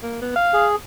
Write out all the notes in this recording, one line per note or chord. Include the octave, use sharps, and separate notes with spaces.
A#3
B3
F5
G#4